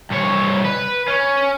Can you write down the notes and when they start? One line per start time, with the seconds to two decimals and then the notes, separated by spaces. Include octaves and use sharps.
0.10 C2 C#5
0.65 B4
1.08 C#4